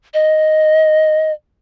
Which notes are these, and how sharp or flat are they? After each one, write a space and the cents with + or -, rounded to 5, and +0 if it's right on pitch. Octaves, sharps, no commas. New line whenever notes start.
D#5 +0